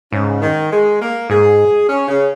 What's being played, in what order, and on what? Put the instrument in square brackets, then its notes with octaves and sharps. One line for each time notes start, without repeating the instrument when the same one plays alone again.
[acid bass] G#2 [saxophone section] C#3
[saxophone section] D#3
G#3
A#3
[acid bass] G#2 [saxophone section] G#4
[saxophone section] C#4
C#3